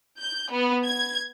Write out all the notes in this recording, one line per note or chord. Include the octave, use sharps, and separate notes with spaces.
G6
B3
G#6